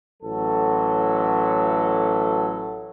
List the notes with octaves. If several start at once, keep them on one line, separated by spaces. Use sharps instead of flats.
A1 F#3 A4